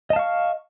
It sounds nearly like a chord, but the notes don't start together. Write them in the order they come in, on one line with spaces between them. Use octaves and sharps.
D#5 A5 F5 C#6